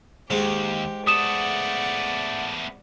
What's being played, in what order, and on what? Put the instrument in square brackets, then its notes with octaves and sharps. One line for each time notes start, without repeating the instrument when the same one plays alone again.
[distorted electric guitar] D#2 [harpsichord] G#2 G#3 [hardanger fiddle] G4
[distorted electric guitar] A3 B3 [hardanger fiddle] D5 F#5 [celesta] D#6 E7